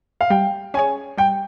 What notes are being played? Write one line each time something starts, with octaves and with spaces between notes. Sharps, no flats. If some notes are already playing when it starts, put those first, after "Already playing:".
F5
G3 G5
C#4 G#4 C#5 G#5
G3 G5